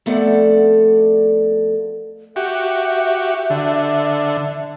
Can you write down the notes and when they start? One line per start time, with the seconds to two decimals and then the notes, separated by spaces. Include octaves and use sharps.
0.06 F2 A3 B3 A4 D5 F#5
2.36 F#4 G4 E5
3.50 D3